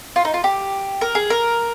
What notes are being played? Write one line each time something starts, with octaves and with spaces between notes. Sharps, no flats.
F4
D#4
F4
G4
A#4
G#4
A#4